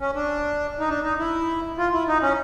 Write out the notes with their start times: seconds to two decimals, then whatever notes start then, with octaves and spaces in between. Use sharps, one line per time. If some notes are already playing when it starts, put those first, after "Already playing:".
0.01 C#4
0.15 D4
0.80 D#4
0.89 D4
1.04 D#4
1.19 E4
1.78 F4
1.93 E4
2.08 D#4
2.22 C#4